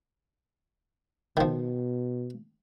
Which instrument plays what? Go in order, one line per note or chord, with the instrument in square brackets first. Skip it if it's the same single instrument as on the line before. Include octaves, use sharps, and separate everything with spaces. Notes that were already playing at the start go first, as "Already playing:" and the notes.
[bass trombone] B2 [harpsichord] D#3 F3